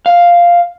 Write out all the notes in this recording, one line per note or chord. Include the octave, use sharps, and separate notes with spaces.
F5